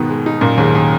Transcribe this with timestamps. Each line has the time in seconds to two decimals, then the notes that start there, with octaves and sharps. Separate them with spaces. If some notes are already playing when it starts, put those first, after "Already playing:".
Already playing: G#2 B2 D#3 B3
0.10 G#3
0.26 D#4
0.41 F#2 A#2 A#3
0.57 D#2 G#2
0.75 D#3